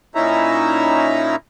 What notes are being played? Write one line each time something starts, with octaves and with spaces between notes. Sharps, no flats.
A#2 C#4 D#4 E4 E5 A#5